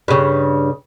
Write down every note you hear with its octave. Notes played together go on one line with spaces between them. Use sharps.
G2 C#3